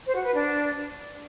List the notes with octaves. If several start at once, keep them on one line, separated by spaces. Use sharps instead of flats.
C5
F#4
B4
D4